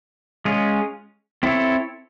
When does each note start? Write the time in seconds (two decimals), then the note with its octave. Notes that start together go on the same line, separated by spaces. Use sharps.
0.45 G#3 C#4 F4 G#4
1.43 C4 E4 A4 C#5